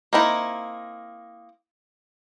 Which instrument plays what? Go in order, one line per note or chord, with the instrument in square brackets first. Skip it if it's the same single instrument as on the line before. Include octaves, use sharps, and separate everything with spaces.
[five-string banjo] A#3 C4 D#4 E4